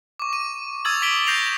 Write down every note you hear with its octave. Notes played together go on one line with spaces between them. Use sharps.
C#6 D6
D#7
C#6 D#6 E6 G#6 A6 F#7
D6 B6 D7 G7
G6 A#6 C7 F7